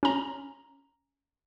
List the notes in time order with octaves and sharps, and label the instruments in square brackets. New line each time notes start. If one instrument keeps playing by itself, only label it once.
[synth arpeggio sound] C#4 A#5